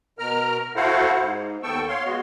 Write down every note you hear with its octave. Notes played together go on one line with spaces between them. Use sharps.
B2 A#4 A#5 F6
E4 F#4 A4 C5 F5 F#5
G#2
D#2 B3 A4 G5 C#6 E6
C#5 F5 C6
G#3 B3 F#4